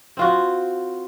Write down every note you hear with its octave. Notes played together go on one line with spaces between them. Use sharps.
C4 F4 F#4